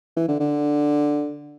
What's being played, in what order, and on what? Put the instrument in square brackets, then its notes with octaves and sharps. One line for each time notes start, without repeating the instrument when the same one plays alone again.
[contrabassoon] E3
D3
D3